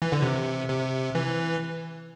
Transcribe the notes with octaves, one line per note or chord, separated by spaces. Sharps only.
E3
D3
C3
C3
E3